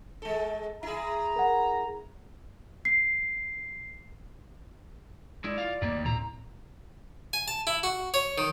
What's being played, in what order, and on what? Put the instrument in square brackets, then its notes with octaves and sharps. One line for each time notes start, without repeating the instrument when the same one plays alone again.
[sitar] G#3 A4
[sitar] E4 G#4 [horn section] A#5
[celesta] A#4 F#5
C7
[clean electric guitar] G#3 E4 [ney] D5
[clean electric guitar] F4 F5
[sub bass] D2 [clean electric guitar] D#3 G3 A#3
[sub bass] A2 [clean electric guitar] C4 A#5
[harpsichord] G#5
A5
E4
F#4
C#5
D#3